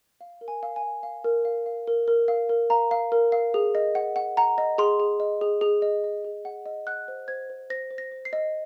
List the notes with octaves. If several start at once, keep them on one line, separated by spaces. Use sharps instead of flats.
F5
A#4
G#5
F5
G#5
F5
F5
A#4
F5
F5
A#4
A#4
F5
A#4
F5 A#5
F5
A#4
F5
G#4
D#5
F#5
F#5
F#5 A#5
D#5
G#4 C6
G#4
D#5
G#4
G#4
D#5
D#5
G#4
F#5
D#5
F#5 F#6
C5
C5 G#6
C5
C5 A#6
C5
A#6
C5
C7
D#5